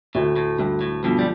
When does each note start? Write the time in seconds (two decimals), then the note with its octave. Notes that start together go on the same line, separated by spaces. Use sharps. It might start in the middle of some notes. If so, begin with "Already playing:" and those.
0.15 D2 A2
0.36 A2
0.59 D2 G2
0.81 A2
1.03 G2 B2 F3
1.19 G3